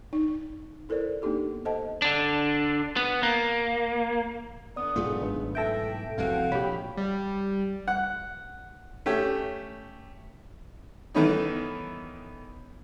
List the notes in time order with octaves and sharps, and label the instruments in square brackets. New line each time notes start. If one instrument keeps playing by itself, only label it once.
[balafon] D#4
E4 A4 A#4 C5 D5
A#3 B3 D4 D#4 G4 A4
A4 C5 D#5 F#5 A5
[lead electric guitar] D3 D4
B3
A#3
[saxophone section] D3 B3 [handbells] D5 D#6
[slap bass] B1 G#2 A3 [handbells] F4 G#4
[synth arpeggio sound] G#1 D4 B4
[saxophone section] E3 E5 [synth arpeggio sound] A4 G5 D7 [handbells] G6 A#6
[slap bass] F1 C2 F#2 [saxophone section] C4 F#4 F5
[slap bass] A#1 [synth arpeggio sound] G4 G5 B5 [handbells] C#5
[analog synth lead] G3
[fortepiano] F#5
A3 C#4 G4
D#3 E3 A3 B3 C#4 D#4